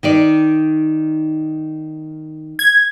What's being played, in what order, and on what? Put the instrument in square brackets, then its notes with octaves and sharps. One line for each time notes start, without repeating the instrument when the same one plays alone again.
[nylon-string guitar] D#3 D#4 D5
[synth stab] G#6